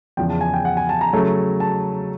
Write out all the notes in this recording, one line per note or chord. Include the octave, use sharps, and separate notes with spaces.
E2 C#3 F3 G5
A5
G#5
G5
F#5
G#5
A5
A#5
C#3 F#3 A3
A5